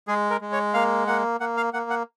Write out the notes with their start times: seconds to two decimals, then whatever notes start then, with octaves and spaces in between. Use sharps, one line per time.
0.08 G#3 G#4
0.30 A#4
0.41 G#3
0.52 C#5
0.74 A#3 F5
1.07 A#3 F#5
1.40 A#3 F#5
1.57 F5
1.73 A#3 F#5
1.90 F#5